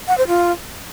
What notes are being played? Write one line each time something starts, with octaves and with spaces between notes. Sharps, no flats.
F#5
C5
F4